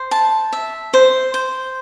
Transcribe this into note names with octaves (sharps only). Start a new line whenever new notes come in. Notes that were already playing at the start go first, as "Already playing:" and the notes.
Already playing: C5
A5
E5
C5
C5